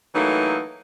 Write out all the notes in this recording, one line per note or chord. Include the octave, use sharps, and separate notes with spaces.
E3 F#3 A3 A#3 D#4